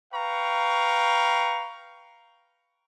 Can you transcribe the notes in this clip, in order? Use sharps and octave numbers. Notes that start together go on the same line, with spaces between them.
B4 F5 G5 A#5 C#6